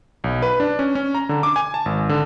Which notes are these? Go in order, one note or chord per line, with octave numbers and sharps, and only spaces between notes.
B1
B4
D4
C#4
C#4
A#5
D3
D6
G#5
A5
G#1
D3